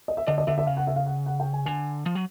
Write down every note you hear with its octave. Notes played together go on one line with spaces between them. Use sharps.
D#5
E5
D3 D#5
D#5
D3 E5
E5
C#3 F5
F#5
E5
F5
F#5
F#5
G5
G#5
D3 G#5
F3
F#3